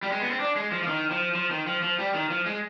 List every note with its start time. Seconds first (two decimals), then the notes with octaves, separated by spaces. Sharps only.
0.03 G3
0.12 G#3
0.21 B3
0.31 C4
0.40 D4
0.56 G#3
0.72 F3
0.83 F3
0.87 D#3
1.11 F3
1.35 F3
1.51 D#3
1.67 F3
1.83 F3
1.99 G3
2.14 D#3
2.30 F3
2.46 G#3